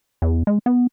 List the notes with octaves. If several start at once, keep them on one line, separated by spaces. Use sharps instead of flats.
E2
G#3
B3